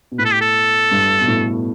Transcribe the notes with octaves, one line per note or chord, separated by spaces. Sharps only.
B2
A2 B4
A4
G4
A4
G2
B2
A2